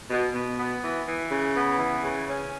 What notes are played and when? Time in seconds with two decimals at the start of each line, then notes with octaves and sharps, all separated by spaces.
0.10 B2
0.33 B2
0.58 B3
0.83 E3
1.07 E3
1.30 C#3
1.55 B3
1.79 E3
2.04 C#3
2.28 C#4